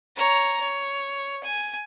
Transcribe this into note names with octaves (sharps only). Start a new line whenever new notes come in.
C#5 A#5
C#5
G#5